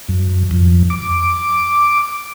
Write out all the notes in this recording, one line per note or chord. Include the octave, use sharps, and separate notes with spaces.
F#2
F2
D6